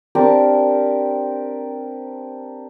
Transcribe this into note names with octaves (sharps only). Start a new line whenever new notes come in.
C4 D4 G4 A#4